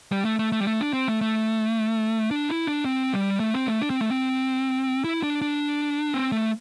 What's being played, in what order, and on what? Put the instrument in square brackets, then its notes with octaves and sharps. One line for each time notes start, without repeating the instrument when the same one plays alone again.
[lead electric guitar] G3
A3
A3
A3
G3
A3
D4
C4
A3
A3
D4
E4
D4
C4
G3
A3
C4
A3
D4
C4
A3
C4
E4
D4
D4
C4
A3